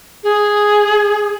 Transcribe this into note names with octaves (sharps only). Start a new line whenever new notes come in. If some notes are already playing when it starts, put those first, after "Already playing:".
G#4